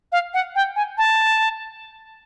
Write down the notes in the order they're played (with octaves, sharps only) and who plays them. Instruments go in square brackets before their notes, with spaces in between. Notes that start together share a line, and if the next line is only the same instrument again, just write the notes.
[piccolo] F5
F#5
G5
G#5
A5